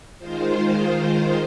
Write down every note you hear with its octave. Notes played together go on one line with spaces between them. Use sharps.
D#3 G#3 F4 C5